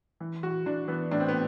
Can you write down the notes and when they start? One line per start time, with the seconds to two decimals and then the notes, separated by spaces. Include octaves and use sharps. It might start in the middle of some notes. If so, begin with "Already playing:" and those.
0.20 E3
0.43 E3 F#4
0.66 E3 D4
0.88 E3 B3
1.11 A2 D4
1.20 C4
1.28 B3